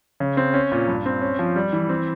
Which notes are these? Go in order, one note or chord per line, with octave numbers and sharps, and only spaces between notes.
C#3
C4
C#4
A#2
G2
C4
C#4
F3
G3
E3
C4